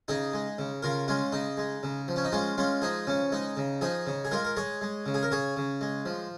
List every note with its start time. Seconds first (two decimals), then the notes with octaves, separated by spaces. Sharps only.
0.08 C#3 D#4 G#4
0.33 G#3
0.58 C#3
0.83 C#3 F4 A#4
1.08 G#3 C#4 F4
1.32 C#3 D#4
1.57 G#3
1.83 C#3
2.08 F3
2.16 C#4
2.24 D#4
2.32 G#3 C#4 F4
2.57 G#3 C#4 F4
2.82 F3 D#4 G#4
3.07 C#3 C#4
3.32 G#3 D#4
3.57 C#3
3.81 F3 D#4 G#4
4.06 C#3
4.25 G#4
4.31 G#3 F4 A#4
4.45 A#4
4.57 G#3 G#4 C#5
4.81 G#3
5.06 C#3
5.14 G#4
5.23 A#4
5.31 C#3 G#4 C#5
5.57 C#3
5.81 G#3
6.06 F3